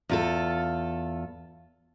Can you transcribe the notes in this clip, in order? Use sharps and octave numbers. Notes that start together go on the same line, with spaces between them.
E2 F4 A4